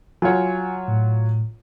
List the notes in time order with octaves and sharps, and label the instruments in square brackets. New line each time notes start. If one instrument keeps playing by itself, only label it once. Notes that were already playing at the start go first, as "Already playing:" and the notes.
[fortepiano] F#3 F4 C#5 [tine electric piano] G#5
[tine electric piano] A2